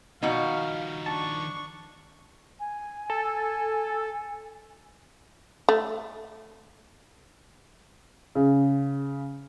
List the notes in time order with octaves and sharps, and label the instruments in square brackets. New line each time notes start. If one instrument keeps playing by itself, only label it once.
[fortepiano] B2 [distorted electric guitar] D#3 F3 [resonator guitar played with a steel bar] D#4 F#4 [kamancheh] F5
[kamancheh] D4 C#6 [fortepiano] A5
[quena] G#5
[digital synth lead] A4
[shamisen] A3
[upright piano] C#3